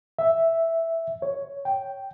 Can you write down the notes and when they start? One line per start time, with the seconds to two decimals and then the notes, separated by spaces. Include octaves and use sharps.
0.19 E5
1.22 C#5
1.65 G5